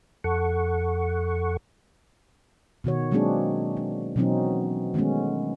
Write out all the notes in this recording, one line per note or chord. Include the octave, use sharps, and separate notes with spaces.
F2 A4 F#5 C#6
B2 D#3 F#4 C#5
F#3 G#3 A#3 C4 D4 G#4
D4
B2 E3 F#3 C4 C#4 D#4
D#3 G#3 A3 B3 C#4